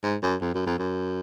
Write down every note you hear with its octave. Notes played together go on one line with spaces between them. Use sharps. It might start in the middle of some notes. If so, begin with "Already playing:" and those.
G#2
F#2
F2
F#2
F2
F#2